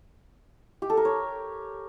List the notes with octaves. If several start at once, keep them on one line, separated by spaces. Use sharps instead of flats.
G4
A4
A#4
C#5